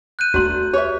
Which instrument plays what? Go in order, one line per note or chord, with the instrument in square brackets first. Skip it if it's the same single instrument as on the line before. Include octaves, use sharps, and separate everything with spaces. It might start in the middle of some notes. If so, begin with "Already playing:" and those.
[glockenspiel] F#6 G6 D#7
[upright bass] D#2 A3 [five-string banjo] B3 D4 [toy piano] F#4 A#5 C6
[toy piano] G4 B4 [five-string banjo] C#5 E5